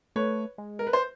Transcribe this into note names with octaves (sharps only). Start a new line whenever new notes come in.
A3 B4 C#5
G#3
A#4
B4
C5